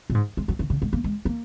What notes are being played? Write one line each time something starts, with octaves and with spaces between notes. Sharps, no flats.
A#2
G#2
G#3
F#3
D#3
C#3
G#3
A#3
G#3
A#3